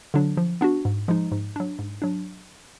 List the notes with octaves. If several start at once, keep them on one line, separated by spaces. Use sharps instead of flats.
D3 F#3 D4
F3
B3 D4 F#4
G#2
F3 G#3 D#4
G#2
F#3 D4
G#2
F#3 D4